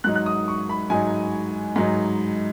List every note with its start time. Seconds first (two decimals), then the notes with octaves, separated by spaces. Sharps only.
0.04 G#2 F#3 D#4 F#6
0.15 F#6
0.26 D#6
0.48 C#6
0.69 B5
0.90 G#2 F#3 D#4 G#5
1.76 G#2 F#3 D#4